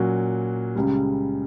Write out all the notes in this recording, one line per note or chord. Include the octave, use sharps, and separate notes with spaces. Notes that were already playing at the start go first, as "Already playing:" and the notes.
Already playing: A#2 F#3 C#4 F#4
C#2 C#3 G3